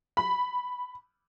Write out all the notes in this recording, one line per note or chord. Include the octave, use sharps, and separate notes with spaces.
B5